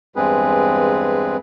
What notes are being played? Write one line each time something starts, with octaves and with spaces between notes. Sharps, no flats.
E2 G2 G#3 C4 G#4 B4